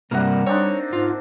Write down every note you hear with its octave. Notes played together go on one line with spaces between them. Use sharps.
G2 C3 G3 A#3 A#4 E5 F#5
C4 D4 D#4 C#5
G#2 F4